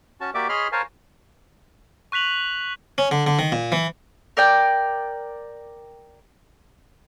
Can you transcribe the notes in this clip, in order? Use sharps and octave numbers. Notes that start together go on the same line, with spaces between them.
C#4 F#4 A5
A#3 F#4 G4 D5 E5 D6
G#4 C#5 D#5 B5 C6 F6
A#4 C5 C#5 F5 G#5 A5
C#6 F#6 B6 F7 F#7
C#4
D3
D3
D#3
A#2
E3
A#4 D5 G5